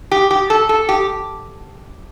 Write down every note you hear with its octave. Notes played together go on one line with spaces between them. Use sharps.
G4
G4
A4
A4
G4